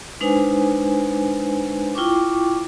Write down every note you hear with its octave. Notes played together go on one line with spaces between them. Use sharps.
G#3 D4 D#4 B4 C5 G#5
E4 F4 G5 C#6 D6